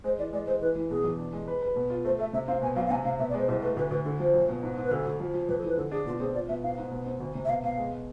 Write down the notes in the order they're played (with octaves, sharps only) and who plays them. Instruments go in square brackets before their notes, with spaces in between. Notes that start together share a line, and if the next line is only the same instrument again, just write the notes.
[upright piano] G#3 [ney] C5
[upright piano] E3 [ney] D5
[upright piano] G#3 [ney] D5
[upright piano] G#3 [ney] C5
[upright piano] E3 [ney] B4
[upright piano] E3
[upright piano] B2 [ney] G#4
[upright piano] E2
D4
G#3
B4
B4
B2
F4
[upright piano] A3 [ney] C5
[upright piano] A3 [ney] E5
[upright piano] C3 [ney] E5
[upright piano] C4 [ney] F5
[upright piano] B2 [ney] G#5
[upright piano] B1 [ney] F5
[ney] F5
[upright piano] C3 [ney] G#5
[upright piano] C3 [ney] F5
[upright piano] B2 [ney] E5
[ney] D5
[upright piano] G#3 [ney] C5
[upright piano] C2 [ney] C5
[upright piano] A3 [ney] B4
[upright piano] D2 [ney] B4
[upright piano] D2 [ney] B4
[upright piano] D3 [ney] A4
[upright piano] F3 [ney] C5
[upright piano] B1
B2
G#2
G#2
[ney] B4
[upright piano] D2 [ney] A4
[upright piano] D2
F3
F3
[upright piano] F2 [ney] B4
[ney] A4
[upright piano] E3
[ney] B4
[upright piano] D3 [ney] A4
[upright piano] D4 [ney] G#4
[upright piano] B2 [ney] F4
[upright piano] C4 [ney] G#4
[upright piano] F4 [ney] D5
[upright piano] B2 [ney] E5
[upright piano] G#2 [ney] F5
[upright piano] G#2
B2
C4
D2
C3
[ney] E5
[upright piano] B2 [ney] F5
[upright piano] B2 [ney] F5
[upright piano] G#3